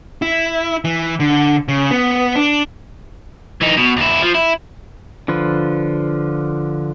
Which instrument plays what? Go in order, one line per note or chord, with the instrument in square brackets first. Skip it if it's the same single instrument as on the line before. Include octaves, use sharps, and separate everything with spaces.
[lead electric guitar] E4
E3
D3
C#3
B3
D4
[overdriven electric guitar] E3 D#4
B2
D#2 E4
F3
E4
[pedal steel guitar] D3 F3 F4 B4